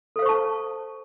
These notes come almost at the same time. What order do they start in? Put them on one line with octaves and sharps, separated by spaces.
A4 F5 C5 C#6 A5